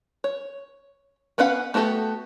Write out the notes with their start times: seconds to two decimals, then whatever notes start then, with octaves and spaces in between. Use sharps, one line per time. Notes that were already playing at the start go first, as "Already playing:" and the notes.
0.24 C#5
1.38 B3 C#4 B4 F5 F#5
1.74 A3 B3 F#4 G4 A4